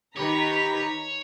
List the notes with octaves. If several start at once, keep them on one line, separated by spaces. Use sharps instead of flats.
D#3 G4 B4 C#5 A#5 B6